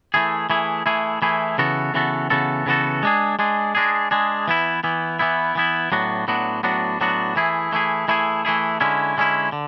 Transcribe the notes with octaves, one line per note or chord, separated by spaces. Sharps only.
E3 A3 E4 G#4
E3 A3 E4 G#4
E3 A3 E4 G#4
E3 A3 E4 G#4
C#3 E3 B3 F#4 A4
C#3 E3 B3 F#4 A4
C#3 E3 B3 F#4 A4
C#3 E3 B3 F#4 A4
G#3 D4 G#4
G#3 D4 G#4
G#3 D4 G#4
G#3 D4 G#4
E3 B3 E4
E3 B3 E4
E3 B3 E4
E3 B3 E4
A2 F#3 B3 D4 F#4
A2 F#3 B3 D4 F#4
A2 F#3 B3 D4 F#4
A2 F#3 B3 D4 F#4
E3 A3 E4 G#4
E3 A3 E4 G#4
E3 A3 E4 G#4
E3 A3 E4 G#4
D3 G#3 C#4 E4
D3 G#3 C#4 E4
D3